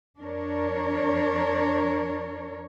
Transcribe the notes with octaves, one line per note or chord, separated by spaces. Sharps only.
F2 D4 A#4 C#5